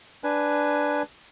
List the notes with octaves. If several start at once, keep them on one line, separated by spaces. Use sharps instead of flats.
D4 B4 G#5